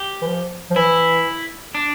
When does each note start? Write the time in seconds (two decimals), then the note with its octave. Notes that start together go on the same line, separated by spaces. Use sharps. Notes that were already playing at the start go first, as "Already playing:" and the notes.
Already playing: G4
0.22 E3
0.27 F3
0.70 F3
0.76 E3 E4
1.75 D4